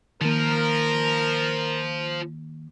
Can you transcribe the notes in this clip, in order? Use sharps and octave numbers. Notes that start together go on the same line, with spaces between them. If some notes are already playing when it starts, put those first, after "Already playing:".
D#3 F3 A#3 A#4